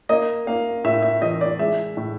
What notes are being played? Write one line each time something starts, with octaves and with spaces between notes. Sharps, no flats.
A#3 D#5
A#3 F5
A2 E5
E5
E3 D#5
D5
G#3 E5
A2